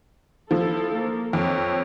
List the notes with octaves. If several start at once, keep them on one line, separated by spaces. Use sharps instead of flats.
F3 E4 A4
A#3
F2 C#5